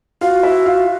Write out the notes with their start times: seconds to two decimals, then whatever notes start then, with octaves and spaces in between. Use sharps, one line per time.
0.21 F4 F#4 F5
0.43 E4 E5
0.66 F4 F5